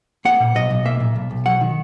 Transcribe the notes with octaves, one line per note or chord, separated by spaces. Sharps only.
A#3 F#5
A#2
B1 D#5
B1
A#3 E5
A#2
B1
B1
F#3 F#5
D#3